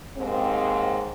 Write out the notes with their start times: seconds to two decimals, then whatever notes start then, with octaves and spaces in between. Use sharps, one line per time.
0.16 D#2 G#2 C4